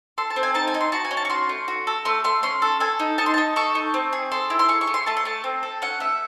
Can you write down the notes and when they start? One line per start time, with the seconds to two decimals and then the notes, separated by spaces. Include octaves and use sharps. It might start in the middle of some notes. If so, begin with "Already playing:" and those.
0.18 A4 C6
0.30 A5
0.36 C4
0.43 G#5
0.54 D#4 A5
0.68 G#5
0.74 D#4
0.81 C6
0.92 F#4 A5
1.05 G#5
1.11 C#4
1.17 A5
1.25 C#6
1.30 F#4 C6
1.49 A3
1.68 F#4
1.87 A4
2.05 A3 C6
2.24 A3 C6
2.43 C#4 C6
2.62 A4
2.80 A4 G#5
3.00 D#4
3.18 D#4 A5
3.26 C6
3.34 D#4 A5
3.56 A4 C#6
3.75 D#4
3.94 C4
4.13 G#4
4.32 A4 C6
4.50 E4
4.59 C6
4.68 G#4 C#6
4.81 C#6
4.87 A3
4.94 C6
5.06 A3 A5
5.17 C6
5.25 A3 A5
5.44 C4
5.63 A4
5.82 C#4 F#5
6.00 A3 E5